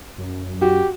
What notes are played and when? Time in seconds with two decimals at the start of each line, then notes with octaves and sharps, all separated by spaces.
0.18 F#2
0.61 F#4 G4